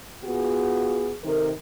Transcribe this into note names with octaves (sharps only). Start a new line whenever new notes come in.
B3 F4 F#4 G#4
C3 D#3 A4 A#4